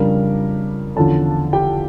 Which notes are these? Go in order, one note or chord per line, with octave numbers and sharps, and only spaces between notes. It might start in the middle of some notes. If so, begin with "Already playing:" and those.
Already playing: F2 C#3 G3 D4 A#4
E2 D3 F3 C#4 A4 A5
G4 G5